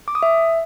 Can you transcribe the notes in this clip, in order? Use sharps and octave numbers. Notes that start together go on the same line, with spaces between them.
D6
D#6
E5